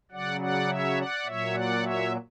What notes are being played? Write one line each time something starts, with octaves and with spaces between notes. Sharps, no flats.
C#3 F#3 D5 F#5
D5 F#5
C#5 E5
D5 F#5
A#2 F#3 C#5 E5
D5 F#5
C#5 E5